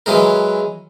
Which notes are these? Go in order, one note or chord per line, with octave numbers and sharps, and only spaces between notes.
E3 F#3 G#3 A#4